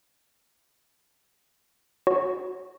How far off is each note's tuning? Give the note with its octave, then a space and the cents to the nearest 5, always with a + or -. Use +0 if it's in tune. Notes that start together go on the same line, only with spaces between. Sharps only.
F#4 +0 C#5 +0